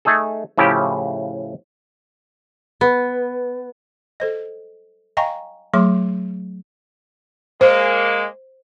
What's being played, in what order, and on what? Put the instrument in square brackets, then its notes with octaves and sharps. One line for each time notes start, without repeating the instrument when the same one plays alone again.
[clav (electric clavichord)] A3 D#4 G#4 A4
A2 C#3 F3 E4 G4
[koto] B3
[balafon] A4 C5 D#5
D#5 F5 G5 G#5 A#5 C#6
F#3 A3 G#4 C6 D6
[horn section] G#3 A#3 [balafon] C5